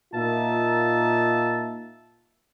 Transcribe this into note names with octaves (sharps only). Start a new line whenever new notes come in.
A#2 A#3 D#4 F4 E5 A5